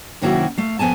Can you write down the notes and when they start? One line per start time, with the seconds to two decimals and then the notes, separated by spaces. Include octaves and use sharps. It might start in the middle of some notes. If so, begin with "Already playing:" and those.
0.22 F#2 C3 D#3 A#3 E4 F#4
0.57 A3 F5
0.79 F2 B3 G#5 A5